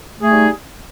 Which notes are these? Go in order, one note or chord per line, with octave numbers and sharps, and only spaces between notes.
G3 A3 D#4 G#4